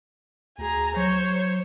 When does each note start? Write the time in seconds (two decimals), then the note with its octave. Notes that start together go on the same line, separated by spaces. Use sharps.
0.58 D2 G#4 A#5
0.96 F#3 C5 C#5